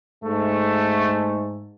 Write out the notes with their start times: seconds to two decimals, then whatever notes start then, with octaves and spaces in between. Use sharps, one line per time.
0.24 G#2 A3